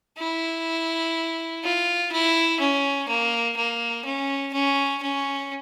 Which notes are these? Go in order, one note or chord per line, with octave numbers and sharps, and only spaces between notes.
E4
F4
E4
C#4
A#3
A#3
C#4
C#4
C#4